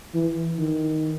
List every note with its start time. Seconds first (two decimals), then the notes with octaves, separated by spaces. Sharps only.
0.14 E3
0.59 D#3